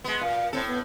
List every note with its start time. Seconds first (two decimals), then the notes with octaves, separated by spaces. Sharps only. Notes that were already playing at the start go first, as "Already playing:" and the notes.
0.04 G#3 B3
0.21 A#2 F5
0.53 A2 C4 A4
0.67 B3